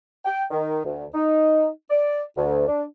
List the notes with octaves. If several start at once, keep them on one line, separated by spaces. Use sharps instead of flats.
G5
D#3
D2
D#4
D5
D2
D4